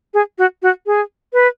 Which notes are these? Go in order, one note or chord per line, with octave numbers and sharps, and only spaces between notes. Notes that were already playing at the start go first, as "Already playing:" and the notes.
G#4
F#4
F#4
G#4
B4